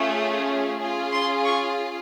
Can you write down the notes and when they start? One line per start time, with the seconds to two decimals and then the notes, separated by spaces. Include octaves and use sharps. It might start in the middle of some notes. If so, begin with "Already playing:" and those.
Already playing: A3 C#4 F4 G#4
0.79 C#4 F4 G#4
1.11 C6
1.44 C#6